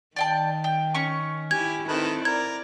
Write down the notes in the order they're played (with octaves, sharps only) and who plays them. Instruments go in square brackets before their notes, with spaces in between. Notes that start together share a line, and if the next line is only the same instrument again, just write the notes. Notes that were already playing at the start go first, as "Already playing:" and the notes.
[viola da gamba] D#3 [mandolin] D5 G5 A5
[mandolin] G5
C#4 C#6
[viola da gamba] E4 G4 [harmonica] G#5 [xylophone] G#6
[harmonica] D#3 B4 A5 [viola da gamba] C4 E4 A4
[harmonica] A#4 [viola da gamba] D5 [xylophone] G#6